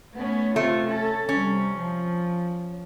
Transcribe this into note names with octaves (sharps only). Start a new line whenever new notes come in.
A3 B3 C#4
C3 A3 C4 F4
C#4 A4
C3 G3 C#4
F3